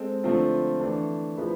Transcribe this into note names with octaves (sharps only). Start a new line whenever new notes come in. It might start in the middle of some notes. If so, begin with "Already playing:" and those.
Already playing: G#3 C4 A4
D3 F3 A3 C4 F4
E3 A3 D4
F3 B3 E4 G#4 B4